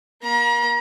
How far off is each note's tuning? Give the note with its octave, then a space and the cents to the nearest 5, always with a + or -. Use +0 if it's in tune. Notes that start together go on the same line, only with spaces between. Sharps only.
A#3 +25 A#5 +40